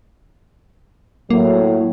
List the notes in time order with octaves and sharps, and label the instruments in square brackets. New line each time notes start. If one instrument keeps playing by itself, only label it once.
[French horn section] A2 F#3 [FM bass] A#3